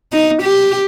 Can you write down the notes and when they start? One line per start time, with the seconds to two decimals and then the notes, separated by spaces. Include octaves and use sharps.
0.13 D#4
0.43 G4